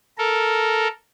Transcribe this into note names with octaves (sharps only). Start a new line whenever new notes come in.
A4 A#4